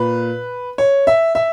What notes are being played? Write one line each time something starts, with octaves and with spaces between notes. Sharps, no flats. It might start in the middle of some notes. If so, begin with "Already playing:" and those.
Already playing: A#2 B4
C#5
E5
E5